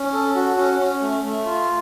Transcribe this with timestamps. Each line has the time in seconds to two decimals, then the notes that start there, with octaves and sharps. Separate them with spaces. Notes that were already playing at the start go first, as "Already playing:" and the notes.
Already playing: C#4
0.13 A4
0.35 F#4
0.57 C#4
0.80 C#4
1.02 A3
1.24 A3
1.45 F4